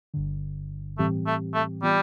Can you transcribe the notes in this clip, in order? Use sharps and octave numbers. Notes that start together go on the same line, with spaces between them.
G1 G2 D3
A2 E3 G3 A3 C4 G4
A3
A3
E3 G3 B3 F4